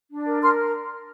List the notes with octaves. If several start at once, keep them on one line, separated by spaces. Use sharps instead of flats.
D4
A#4
A#4 C6 F6